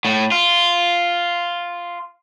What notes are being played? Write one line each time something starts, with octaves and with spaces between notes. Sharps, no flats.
A2
F4